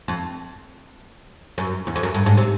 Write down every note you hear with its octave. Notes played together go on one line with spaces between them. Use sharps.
F2
F#2
E2
F2
F#2
G2
G#2
C3